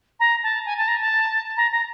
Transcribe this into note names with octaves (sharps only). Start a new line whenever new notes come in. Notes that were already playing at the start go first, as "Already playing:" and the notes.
A#5
A5
G#5
A5
A#5
A5
A#5
A#5